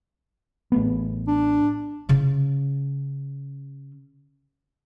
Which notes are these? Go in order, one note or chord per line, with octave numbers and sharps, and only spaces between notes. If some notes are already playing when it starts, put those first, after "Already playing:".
A1 A3 B3
D4
C#3 C#4